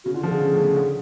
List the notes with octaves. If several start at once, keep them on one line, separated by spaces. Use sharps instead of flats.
C#3 F#4
D3 F4
F3 C#4
A4
D3 G#4
C#3
A2
C#3
D3